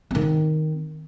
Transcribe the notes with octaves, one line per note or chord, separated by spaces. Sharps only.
D#3 C4